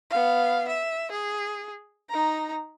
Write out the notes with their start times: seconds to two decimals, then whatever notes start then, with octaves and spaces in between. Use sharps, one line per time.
0.10 B3 F5
0.68 E5
1.11 G#4
2.09 D#4 A#5